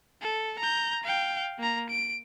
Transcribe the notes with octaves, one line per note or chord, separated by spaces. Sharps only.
A4
A#5 G6
F5 G5
A#3 A#5
D7